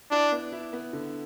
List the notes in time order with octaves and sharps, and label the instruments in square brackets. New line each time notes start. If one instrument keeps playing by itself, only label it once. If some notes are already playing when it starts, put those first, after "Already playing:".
[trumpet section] D4 [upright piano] E4
[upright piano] B3
E4
B3
D3